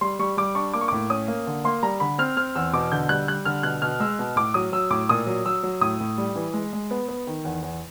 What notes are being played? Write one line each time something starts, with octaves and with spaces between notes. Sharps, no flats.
G3 C6
G3 C#6
G3 D6
D4 C#6
A#3 D6
C#6
A2 D6
C#4 D#6
A#3
D3
A#3 C6
G3 A#5
D3 B5
C4 F6
C4 F6
E2 E6
B2 D6
D3 G6
G3 F#6
G3 F#6
D3 F6
B2 F#6
B2 F6
G#3 E6
B2
A2 D6
F#3 D#6
F#3 E6
A2 D6
A#2 D#6
F#3
F#3 E6
F#3
A2 D#6
A2
G3
E3
G#3
G#3
B3
B3
D#3
E2
E2